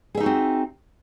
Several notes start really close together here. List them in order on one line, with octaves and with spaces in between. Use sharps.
G#4 E5 D#4 F#4 C4